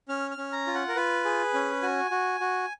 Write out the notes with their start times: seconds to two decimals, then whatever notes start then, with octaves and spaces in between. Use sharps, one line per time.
0.09 C#4 F6
0.31 F6
0.38 C#4
0.52 A#5
0.67 F4
0.74 F#5
0.88 A#4
0.95 F4 B4
1.25 G#4
1.54 C#4
1.82 F#4 G#5
2.11 F#4
2.40 F#4